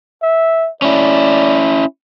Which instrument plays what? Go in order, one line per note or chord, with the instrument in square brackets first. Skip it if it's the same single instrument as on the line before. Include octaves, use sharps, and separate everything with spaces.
[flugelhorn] E5
[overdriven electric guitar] C#4 E4 [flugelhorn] D5